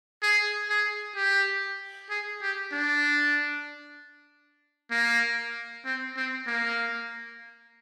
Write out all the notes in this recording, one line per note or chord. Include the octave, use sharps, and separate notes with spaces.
G#4
G#4
G4
G#4
G4
D4
A#3
C4
C4
A#3